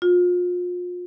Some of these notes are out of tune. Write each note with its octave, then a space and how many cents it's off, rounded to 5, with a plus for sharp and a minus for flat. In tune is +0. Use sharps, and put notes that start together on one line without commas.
F4 +35